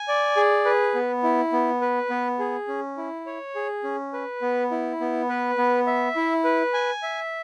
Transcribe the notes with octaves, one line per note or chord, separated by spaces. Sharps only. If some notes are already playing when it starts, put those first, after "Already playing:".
Already playing: G#5
D5
G#4
B4
B3
E4
B3
B4
B3
G#4
C#4
E4
C#5
G#4
C#4
B4
B3
E4
B3
B4
B3
E5
E4
B4
G#5
E5